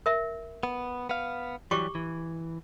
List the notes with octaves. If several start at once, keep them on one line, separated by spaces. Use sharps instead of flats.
A#4 E5
B3
B3 F5
E3 F#3 G3 G4 C#6 D6
E3